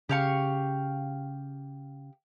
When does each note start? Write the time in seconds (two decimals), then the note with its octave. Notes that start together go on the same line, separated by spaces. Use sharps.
0.09 C#3 G4 F5 C#6